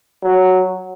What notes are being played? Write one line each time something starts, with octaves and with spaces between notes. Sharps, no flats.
F#3